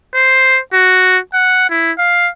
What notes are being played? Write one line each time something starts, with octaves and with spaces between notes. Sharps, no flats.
C5
F#4
F#5
E4
F5